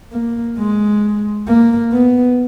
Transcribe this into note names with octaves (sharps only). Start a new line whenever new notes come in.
A#3
G#3
A#3
B3